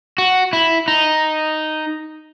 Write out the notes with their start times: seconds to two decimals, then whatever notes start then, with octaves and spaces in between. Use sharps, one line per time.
0.18 F#4
0.53 E4
0.88 D#4